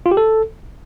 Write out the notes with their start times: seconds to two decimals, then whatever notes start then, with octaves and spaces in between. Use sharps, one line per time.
0.06 F4
0.11 G4
0.17 A4